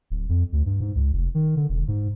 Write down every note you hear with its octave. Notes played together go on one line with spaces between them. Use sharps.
D1
F2
D2
G2
G#2
C#2
F1
D#3
D3
E1
G#2